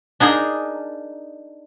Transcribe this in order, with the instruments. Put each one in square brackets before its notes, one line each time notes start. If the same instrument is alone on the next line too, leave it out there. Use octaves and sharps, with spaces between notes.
[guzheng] D4 D#4 G#4 A#4